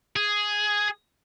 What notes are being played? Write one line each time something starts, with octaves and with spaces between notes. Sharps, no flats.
G#4